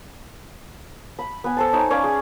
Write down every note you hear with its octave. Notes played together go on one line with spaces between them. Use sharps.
B5
B3 G#5
A4 C5 A5
D#4 C#5 G#5
C#4 B4 D5 F5
G#4